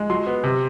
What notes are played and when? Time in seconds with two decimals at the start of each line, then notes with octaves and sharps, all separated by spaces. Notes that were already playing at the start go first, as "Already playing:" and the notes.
Already playing: G#3
0.10 F#3 C6
0.27 B3
0.44 C3